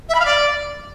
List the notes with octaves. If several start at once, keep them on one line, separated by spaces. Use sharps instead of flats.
E5
B5
F5
D5